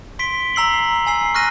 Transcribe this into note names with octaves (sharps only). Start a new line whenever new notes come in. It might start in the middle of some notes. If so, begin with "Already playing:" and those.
C6 B6 D7 G7
A#5 E6 C7 F#7 G7
G#5 E6 C7
C#6 F6 F#6 A#6 D#7